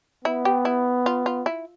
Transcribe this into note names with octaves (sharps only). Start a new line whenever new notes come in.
B3 E4
G4
E4
F4
F4
E4